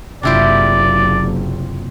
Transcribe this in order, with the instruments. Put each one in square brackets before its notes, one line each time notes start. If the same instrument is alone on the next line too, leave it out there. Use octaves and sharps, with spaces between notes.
[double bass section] F#1 [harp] C3 A#3 F4 [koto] D4 E4 G4 [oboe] D5